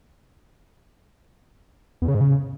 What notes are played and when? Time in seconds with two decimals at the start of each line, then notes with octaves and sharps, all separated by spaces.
2.02 E2
2.08 C#3
2.14 G#2
2.21 C#3